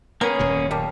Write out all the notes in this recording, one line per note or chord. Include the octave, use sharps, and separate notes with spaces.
A#3 B3 C#4 G#4 A#4 C#5
D#1 F#2 B2
G3 A#3 A5